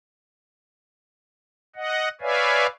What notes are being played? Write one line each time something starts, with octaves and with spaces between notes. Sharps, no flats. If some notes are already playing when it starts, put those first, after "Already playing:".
D#5 F#5
B4 C#5 D5 E5 F5 G#5